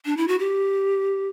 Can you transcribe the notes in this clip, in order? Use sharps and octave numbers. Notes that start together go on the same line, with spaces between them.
D4
E4
F#4
G4